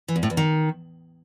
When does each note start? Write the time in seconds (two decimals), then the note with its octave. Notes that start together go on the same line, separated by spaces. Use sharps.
0.08 E3
0.16 E2
0.23 A2
0.30 E2
0.37 D#3